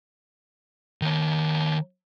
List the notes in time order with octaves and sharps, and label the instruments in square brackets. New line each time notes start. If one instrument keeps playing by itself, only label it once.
[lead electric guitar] D#3 C#5